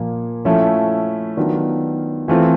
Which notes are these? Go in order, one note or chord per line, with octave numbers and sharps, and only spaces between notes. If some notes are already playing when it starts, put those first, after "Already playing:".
Already playing: A#2 F3 A#3
F3 A3 C#4 E4
D#3 F#3 B3 D4 F4
E3 A3 C4 F4